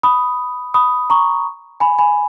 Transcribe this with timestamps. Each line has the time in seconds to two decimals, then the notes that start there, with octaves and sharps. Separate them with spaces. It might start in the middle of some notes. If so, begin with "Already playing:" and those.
0.03 B5 D#6
0.74 B5 D#6
1.10 A#5 C#6
1.80 G#5 B5
1.98 G#5 B5